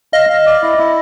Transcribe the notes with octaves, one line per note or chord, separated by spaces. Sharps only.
D#5 F5
F5
D5
E4
E4